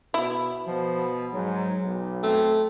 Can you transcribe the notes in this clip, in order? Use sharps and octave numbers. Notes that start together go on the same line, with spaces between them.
B2 E4
B2 F3
G#2 F#3
B1
A3 C4